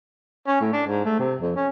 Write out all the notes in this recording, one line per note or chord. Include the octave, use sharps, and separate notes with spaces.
C#4
A2
D4
G#2
A3
C3
F2
C#4